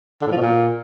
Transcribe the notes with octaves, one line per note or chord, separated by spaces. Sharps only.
D3
A2
F3
B2
A#2